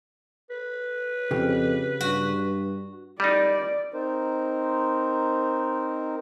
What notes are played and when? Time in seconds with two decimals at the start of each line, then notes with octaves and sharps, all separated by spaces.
0.50 B4
1.31 F2 C#3 G4
2.01 G2 F#4
3.20 G3 D#4 D5
3.94 C4 D#4 A#4 C5